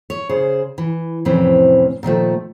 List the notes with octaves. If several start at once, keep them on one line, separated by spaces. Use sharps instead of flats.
C#5
C#3 G#4 C5
E3
F2 A2 C3 E3 C4 C#4
A#2 D#3 F3 A3